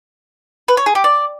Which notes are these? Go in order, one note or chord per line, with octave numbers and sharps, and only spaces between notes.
B4
C#5
G#4
G4
D5